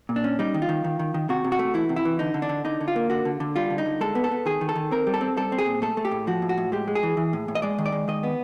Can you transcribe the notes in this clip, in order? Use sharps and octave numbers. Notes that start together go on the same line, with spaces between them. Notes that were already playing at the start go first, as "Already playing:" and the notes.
A#2
D4
C#4
G3 D#4
D#3
F4
D#3
D#3
D#3
D#3
C3 F#4
C3
F#4
A3
E3 E4
C3
E4
E3
D3 D#4
D3
D4
D3
D3 D#4
D3
F4
A#3
D3 F#4
D3
D3
G3 F4
D3
D#4
D3
G#3 A4
B3
A4
B3
D#3 G#4
D#3
A4
D#3
C4 A#4
G3
A4
C4
G3 A4
C4
G#4
A#2
A3 A4
A3
G4
A2
F3 F#4
A2
F#4
A2
G#3 G4
G#3
G#4
E3
E3
A2
A2
D#5
G#3 D5
D#3
D5
G#3
D#3 D#5
B3